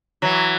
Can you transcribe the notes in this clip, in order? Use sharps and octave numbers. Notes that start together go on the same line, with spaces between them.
E3 F#3